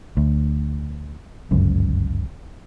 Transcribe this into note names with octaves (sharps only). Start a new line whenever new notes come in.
D2
G1 C#2 F#2